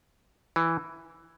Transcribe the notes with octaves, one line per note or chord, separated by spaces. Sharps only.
E3